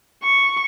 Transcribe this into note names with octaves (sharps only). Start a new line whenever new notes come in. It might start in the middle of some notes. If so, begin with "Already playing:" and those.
C#6